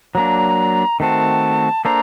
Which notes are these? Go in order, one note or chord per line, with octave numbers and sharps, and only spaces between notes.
F#3 A#3 D4 A#5
D#3 A3 C4 F#4 A5
A#3 D4 A4 C5 A#5